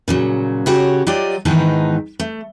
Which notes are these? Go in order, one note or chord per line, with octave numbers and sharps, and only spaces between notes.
A#2 C#3 F#3
C#3 F#4 G4 C#5
F#3 F4 G4 D5 D#5
G#2 D#3 E3 B3 D#4 A5
A3